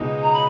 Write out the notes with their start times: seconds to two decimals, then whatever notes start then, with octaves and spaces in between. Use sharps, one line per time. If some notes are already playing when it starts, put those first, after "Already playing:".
Already playing: C#2 B2 G#3 D#4
0.22 A#5
0.32 B5